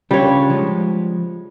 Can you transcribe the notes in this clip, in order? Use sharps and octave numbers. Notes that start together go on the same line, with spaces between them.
C#3 G3 D4 F4 C#5
F3 G#3